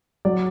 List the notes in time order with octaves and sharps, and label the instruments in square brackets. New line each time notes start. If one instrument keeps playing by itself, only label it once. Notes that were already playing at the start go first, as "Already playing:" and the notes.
[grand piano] F#3 D5